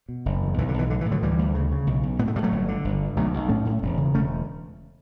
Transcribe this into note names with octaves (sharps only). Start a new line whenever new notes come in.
B2
F#1
E2
B1 E3
D3
B1 E3
A2 D3
E3
A2
D3 F#3
D2 E3 G3
D2
C#3
C#3
B1
B1
A2 B3
A3
A2 G3
F#3 A3
G1
D3
G1
G2
B1 F#3 A3
B1
A2 A3 C#4
A2
E1
C#3
E1 A3 C#4